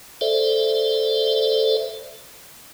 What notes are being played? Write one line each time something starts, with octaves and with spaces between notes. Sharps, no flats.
A4 C5 D5 E5